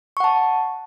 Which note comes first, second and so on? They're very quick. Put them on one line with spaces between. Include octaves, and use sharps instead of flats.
C#6 F#5 A5